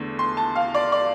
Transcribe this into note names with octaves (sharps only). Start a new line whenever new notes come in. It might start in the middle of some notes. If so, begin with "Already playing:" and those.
Already playing: E2 D3 A3
C6
A5
F5
D5
D5